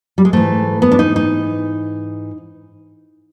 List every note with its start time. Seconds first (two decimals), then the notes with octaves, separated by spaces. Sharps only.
0.18 G3
0.25 G#3
0.33 G#2 E3 A3
0.82 B3
0.92 D4
0.99 D#4
1.16 D#4